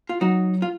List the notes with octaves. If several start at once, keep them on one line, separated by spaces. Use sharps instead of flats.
F4
F#3 D#4 F#4
F4